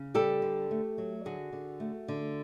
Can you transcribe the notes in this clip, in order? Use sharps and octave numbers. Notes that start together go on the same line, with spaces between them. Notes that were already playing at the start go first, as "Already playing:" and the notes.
Already playing: C#3
G3 G4 A4
D3
A3
F#3
D3 F#4 G#4
D3
A3
D3